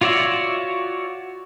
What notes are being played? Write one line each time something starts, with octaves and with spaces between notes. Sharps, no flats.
F4 F#4 C#5 D5 E5